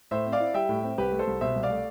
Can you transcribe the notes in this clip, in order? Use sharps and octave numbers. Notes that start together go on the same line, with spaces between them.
A2 C5 E5
C4
D5 F5
E4
G3 E5 G5
A2
C4
C2 G4 B4
A3
A4 C5
C2
B2 C5 E5
C2
D5 F5
A3